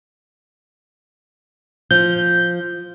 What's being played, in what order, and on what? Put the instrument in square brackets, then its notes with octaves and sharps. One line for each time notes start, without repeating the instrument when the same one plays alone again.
[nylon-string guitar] F3 [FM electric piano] G6